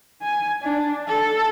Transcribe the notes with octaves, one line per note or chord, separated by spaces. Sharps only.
G#5
D4
A4